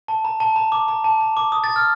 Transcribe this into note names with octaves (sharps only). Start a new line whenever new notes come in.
A5
A#5
A5
A#5
D6
A#5
A5
A#5
D6
D#6
A6
F6